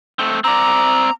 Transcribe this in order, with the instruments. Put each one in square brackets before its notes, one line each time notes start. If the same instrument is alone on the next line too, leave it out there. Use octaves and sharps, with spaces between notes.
[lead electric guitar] A3 C4
[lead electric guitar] C4 D5 [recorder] A#5